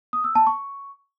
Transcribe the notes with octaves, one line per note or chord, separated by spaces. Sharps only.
D#6
E6
A5
C#6